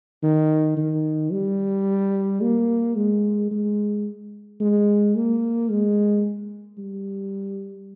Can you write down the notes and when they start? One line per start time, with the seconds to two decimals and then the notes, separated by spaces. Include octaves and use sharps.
0.23 D#3
0.77 D#3
1.32 G3
2.41 A#3
2.96 G#3
3.51 G#3
4.60 G#3
5.15 A#3
5.70 G#3
6.78 G3